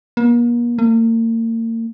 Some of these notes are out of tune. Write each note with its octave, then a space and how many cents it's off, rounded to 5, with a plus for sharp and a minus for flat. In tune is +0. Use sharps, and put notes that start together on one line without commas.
A#3 +40
A#3 -40